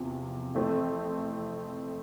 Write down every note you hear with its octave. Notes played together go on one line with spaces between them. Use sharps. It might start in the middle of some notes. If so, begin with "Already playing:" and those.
Already playing: E2 C3 F3
F2 E3 A3 C4